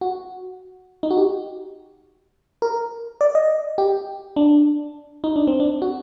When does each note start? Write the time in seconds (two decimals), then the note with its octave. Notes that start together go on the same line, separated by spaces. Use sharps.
0.01 F#4
1.03 D#4
1.11 F#4
1.17 G4
2.62 A#4
3.21 D5
3.35 D#5
3.78 G4
4.36 D4
5.24 D#4
5.36 D4
5.47 C4
5.60 D4
5.82 F#4